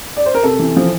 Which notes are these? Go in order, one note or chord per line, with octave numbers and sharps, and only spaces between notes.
D5
C5
A#4
C3 A4
E3
F3